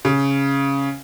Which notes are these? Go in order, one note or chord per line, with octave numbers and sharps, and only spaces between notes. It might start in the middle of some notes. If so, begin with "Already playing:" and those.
C#3